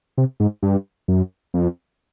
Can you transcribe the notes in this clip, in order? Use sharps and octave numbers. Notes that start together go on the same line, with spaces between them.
C3
G#2
G2
F#2
F2